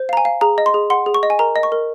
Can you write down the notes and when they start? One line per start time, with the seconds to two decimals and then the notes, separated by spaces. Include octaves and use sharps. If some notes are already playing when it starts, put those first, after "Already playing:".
Already playing: C5
0.09 F5 A#5
0.17 G#5
0.25 F5
0.41 G#4 A#5
0.58 D#5
0.66 C6
0.74 G#4
0.90 F#5 C6
1.06 G#4
1.14 C#6
1.23 D#5
1.30 G#5
1.39 A#4 A#5
1.56 D#5
1.63 C#6
1.72 A#4